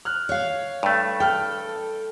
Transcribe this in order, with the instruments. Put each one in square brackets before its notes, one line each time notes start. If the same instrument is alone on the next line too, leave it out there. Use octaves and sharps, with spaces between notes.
[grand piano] F6 F#6
[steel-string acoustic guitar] C#5 F5
[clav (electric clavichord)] G2 A3
[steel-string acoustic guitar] A4 [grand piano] G5 F6